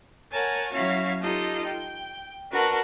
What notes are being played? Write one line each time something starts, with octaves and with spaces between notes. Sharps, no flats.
A#4 C#5 F#5 G#5 A5
F#3 C#4 E4 F#4 C#5 F5
D#4 F4 G4 A4 D#5
G5
D4 F#4 A#4 B4 F#5 A5